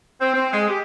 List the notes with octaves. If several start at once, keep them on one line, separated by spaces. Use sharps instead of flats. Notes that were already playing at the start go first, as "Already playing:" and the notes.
C4
C4
G#3
G4